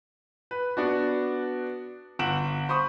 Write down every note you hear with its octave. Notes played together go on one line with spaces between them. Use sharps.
B4
B3 D4 F#4
G1 F#5 D7 E7 F#7
C5 B5 C#6 D#6